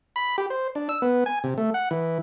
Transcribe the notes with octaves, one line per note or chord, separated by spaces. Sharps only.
B5
G4
C5
D4
E6
B3
G#5
C3
A3
F#5
E3